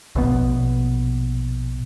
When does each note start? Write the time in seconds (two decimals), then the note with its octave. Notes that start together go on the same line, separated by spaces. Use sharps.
0.15 A#1 B2 B3